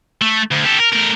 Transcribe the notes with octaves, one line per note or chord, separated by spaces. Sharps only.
A3
D2
G4 A4
A#4
A3 A#4